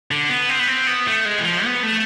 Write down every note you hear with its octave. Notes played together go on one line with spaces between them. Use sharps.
D3
B3
C4
B3
C4
B3
A3
G#3
E3
F3
B3
A3